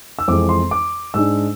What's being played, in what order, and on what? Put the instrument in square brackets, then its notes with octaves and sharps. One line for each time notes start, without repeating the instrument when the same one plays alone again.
[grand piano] E6
F2 E3 G#3 D6
C6
D6
G#2 G#3 D4 E6